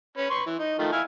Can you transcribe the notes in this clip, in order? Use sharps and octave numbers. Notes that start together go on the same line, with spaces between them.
C#4 B4
B4 C6 C#6
E3
D#4
D#3 F3 A3
E4 F5 G#5